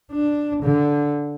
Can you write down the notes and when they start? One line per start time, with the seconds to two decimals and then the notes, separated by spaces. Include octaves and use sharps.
0.12 D4
0.64 D3